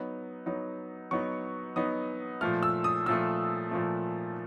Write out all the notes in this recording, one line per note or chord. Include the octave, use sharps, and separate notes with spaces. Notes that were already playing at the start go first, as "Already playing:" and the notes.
Already playing: F#3 B3 D#4
F#3 B3 D#4
F#3 B3 D#4 C#6
F#3 B3 D#4 D#6
A#2 F3 A3 F6
E6
D#6
A#2 F3 A3 E6
A#2 F3 A3